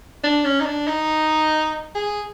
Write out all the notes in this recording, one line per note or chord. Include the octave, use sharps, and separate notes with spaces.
D4
C#4
D#4
D4
D#4
G#4